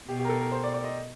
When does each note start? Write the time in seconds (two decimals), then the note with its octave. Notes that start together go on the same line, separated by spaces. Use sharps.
0.08 B2 G4
0.19 G4
0.25 A#4
0.29 A4
0.40 A#4
0.52 C5
0.63 D5
0.74 D5
0.84 D#5